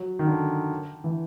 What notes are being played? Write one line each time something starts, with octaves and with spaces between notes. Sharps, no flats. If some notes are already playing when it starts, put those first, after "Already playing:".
Already playing: F#3
D#3
D3
E3